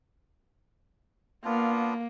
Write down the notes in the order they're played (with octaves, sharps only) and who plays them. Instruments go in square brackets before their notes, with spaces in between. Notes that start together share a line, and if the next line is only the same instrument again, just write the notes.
[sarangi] A#3 [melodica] B3 D4 F4